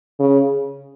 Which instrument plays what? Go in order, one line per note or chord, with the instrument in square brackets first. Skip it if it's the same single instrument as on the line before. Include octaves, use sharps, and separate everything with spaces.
[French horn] C#3